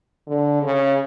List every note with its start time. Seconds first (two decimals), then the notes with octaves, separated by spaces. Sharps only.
0.27 D3
0.62 C#3